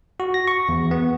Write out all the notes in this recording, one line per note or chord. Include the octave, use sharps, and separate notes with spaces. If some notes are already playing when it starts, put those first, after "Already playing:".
F#4
A#6
C#6
E2
B3